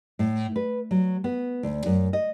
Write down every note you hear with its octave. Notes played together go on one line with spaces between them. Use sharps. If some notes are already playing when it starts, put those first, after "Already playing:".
A2
B4
F#3
B3
D2
F#2
D#5